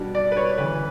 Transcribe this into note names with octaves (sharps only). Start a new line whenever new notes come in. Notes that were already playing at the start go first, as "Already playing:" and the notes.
Already playing: B2 G3 D4
D5
B4
C#5
D2 C#3 E3 B4